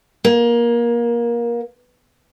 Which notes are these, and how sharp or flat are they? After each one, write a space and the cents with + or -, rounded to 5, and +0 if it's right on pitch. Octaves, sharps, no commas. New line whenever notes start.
A#3 +20